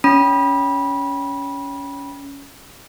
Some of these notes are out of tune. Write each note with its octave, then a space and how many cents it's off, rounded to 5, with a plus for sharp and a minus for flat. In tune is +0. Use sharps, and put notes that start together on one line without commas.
C#4 +15 B5 -25